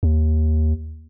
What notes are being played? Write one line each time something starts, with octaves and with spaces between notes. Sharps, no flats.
D#2